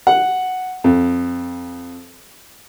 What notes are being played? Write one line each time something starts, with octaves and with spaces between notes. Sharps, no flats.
F#5
F2